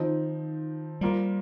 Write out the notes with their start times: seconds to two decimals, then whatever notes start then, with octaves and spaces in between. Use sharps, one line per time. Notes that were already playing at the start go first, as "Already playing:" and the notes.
Already playing: D#3 F3 C4 D#4
1.01 F3 G3 A#3 F4 A#4